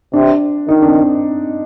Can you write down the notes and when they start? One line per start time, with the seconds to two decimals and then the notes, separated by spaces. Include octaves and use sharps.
0.13 C3 D4
0.68 D#3 D#4
0.82 D4
0.87 C4